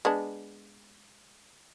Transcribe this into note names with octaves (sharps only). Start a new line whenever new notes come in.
G#3 B3 D4